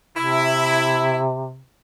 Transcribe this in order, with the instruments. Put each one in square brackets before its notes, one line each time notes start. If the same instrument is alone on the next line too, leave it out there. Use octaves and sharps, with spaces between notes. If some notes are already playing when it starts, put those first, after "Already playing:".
[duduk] C3 [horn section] E4